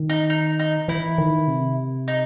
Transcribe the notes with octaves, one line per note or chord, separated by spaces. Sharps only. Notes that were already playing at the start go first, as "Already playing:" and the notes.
Already playing: D#3
D#4
D#4
D#4
E3 E4
D#3
C3
D#4